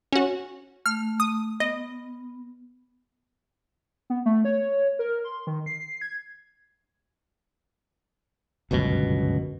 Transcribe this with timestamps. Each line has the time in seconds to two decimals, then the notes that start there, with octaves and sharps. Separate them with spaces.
0.13 C#4 F#4
0.86 A3 F6
1.20 D#6
1.60 B3 D#5
4.10 B3
4.26 A3
4.45 C#5
4.99 A#4
5.24 C6
5.47 D#3
5.66 C7
6.01 G#6
8.71 G1 C#2 F#2 B2